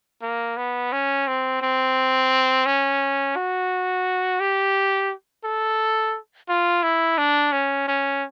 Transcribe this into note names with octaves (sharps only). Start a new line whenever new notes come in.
A#3
B3
C#4
C4
C4
C#4
F#4
G4
A4
F4
E4
D4
C#4
C#4